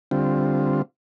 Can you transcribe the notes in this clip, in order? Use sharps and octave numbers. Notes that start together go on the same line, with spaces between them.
D3 G3 C4 F4